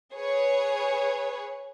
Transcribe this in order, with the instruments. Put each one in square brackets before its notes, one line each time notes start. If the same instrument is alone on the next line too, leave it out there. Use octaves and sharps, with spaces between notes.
[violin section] G#4 B4 C#5